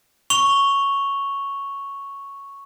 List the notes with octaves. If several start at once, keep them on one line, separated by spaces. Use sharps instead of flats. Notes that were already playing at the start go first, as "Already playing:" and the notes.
C#6 F7 G7